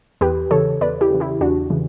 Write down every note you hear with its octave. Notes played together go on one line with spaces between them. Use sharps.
E2 G4 B4
C#3 E3 A4 C#5
E2 B4 D5
E4 G4
C#3 E3
E4 G4
E2 D4 F#4
C#3 E3